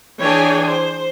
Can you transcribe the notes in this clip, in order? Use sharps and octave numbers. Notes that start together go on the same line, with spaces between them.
E3 D4 G#4 C#5 G5 G#5
C5